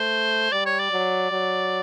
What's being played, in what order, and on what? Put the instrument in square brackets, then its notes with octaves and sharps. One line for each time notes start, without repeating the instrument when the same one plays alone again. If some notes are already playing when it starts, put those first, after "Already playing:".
Already playing: [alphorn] A3 [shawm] C5
[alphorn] G3 [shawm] D5
[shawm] C#5
D5
[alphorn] F#3
F#3